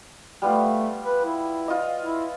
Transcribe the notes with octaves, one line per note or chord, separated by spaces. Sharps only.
G3 A3 B3 F4
B4
E4
F4 D#5
E4